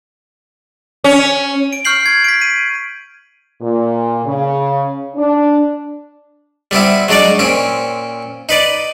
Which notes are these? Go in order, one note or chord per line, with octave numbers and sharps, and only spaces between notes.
C#4
D7
C#6 F6 G6 C7 F#7
G#6
B6 D7
D#7
A#2
C#3
D4
G3 B3 C4 E4
F#3 G#3 D4 D#4 D5
A#2 C4 C#4
D#4 B4 D5